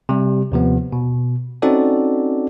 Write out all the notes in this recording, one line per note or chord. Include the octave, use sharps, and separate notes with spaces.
C3 G3
D#2 C3 F3 B3
B2
C4 C#4 D#4 F#4 A4 D5